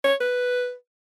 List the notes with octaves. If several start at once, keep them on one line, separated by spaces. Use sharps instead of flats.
C#5
B4